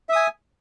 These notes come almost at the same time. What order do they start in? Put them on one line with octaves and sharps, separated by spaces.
E5 D#6 G#5